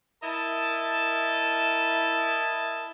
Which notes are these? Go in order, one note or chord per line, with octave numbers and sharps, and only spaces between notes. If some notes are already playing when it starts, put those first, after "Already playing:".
E4 A#4 D#5 E5 A5